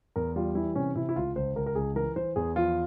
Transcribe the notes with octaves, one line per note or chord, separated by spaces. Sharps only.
E2 A#4
G3 F4
E3 E4
C3 C#4
C3 E4
E4
C#2 F4
C#2 C5
C#2 A#4
A#4
C#2 G#4
E3 A#4
E3 C5
E2 G#4
F3 F4